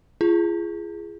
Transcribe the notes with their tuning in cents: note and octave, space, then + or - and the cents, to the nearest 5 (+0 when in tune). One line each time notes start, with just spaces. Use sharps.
F4 -40 G#4 +0